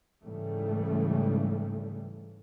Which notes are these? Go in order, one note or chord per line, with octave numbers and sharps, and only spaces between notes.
G#2 C#3 E3 G3 A3